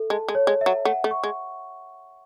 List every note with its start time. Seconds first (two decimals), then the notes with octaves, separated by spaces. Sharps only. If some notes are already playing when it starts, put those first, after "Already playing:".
Already playing: A4 E5
0.10 G#3 A5
0.29 G#3
0.35 C#5
0.47 G#3
0.61 E5
0.66 F#3
0.85 A3 F#5
1.04 A3
1.11 C#6
1.24 G#3